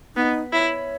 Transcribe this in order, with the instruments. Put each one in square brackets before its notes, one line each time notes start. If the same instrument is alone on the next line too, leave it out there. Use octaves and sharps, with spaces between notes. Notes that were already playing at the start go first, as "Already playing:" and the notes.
[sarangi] B3 [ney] D#4
[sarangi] E4 [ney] C#5